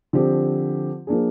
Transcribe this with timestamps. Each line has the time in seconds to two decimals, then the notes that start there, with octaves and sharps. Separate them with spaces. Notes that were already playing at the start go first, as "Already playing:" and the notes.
0.13 D3 F3 C4 G4
1.07 F3 A#3 D4 G#4